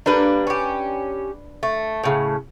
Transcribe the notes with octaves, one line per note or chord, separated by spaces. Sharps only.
G3 A#3 D4 B4
C#4 G4
A3
A2 C#3